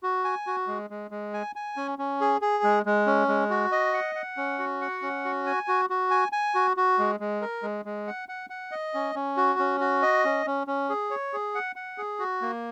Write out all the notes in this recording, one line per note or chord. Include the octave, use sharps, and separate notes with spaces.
F#4
G#5
F#4
G#3
G#3
G#3
G#5
G#5
C#4
C#4
G#4
G#4
G#3
G#3
C#4
G#3
F#4
D#5
F#5
F#5
C#4
F#4
F#5
C#4
F#4
G#5
F#4
F#4
G#5
G#5
F#4
F#4
G#3
G#3
A#4
G#3
G#3
F#5
F#5
F#5
D#5
C#4
C#4
F#4
C#4
F#4
D#5
C#4
C#4
C#4
G#4
C#5
G#4
F#5
F#5
G#4
F#4
A#3